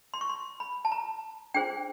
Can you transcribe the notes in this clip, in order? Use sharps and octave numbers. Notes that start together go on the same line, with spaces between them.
C6
C#6
C6
B5
A5
A#5
D4 F4 G#4 C5 G5